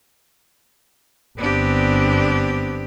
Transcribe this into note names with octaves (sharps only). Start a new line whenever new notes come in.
G1 B3 C4 D4 G4